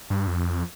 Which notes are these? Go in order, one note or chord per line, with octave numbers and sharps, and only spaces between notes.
G2
F2